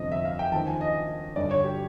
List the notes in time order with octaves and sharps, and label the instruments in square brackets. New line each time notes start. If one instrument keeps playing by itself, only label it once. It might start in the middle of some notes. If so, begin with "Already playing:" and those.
Already playing: [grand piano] G1 F2 C3 F3 D#5
E5
F5
G5
D#2 C#3 F3 A5
G#5
D#5
G1 G2 D3 D5
C#5
G4